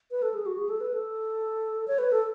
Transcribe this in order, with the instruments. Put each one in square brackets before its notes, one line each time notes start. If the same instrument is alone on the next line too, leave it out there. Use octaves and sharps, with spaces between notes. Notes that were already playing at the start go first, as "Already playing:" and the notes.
[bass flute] B4
A4
G#4
F#4
G#4
A4
B4
A4
C#5
B4
A4